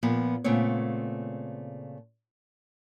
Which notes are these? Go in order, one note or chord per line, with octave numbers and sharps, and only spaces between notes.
A#2 F3 B3
A#2 C#3 A3 B3 C4 C#5